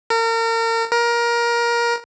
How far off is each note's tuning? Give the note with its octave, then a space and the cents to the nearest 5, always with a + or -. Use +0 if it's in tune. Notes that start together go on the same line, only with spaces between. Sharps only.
A#4 -35
A#4 +20